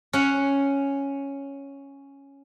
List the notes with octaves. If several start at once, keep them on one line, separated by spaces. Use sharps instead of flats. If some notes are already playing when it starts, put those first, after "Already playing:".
C#4 F#5